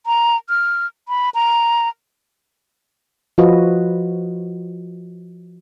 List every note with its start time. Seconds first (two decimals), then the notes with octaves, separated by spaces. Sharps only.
0.06 A#5
0.49 F6
1.08 B5
1.35 A#5
3.38 F3 F4 F#4 B4 D#5